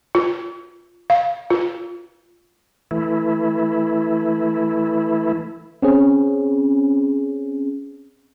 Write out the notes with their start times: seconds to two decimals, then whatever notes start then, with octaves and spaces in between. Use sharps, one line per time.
0.15 F4
1.10 F5
1.50 F4
2.91 E3 A3 E4
5.82 C4 C#4 G#4